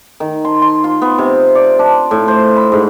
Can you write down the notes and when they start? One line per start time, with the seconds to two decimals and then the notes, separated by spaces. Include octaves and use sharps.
0.20 D#3
0.45 C6
0.62 C6
0.84 F4
1.02 B3
1.18 C3
1.55 D5
1.79 D4
2.11 A2
2.28 C5
2.56 B5
2.72 G#2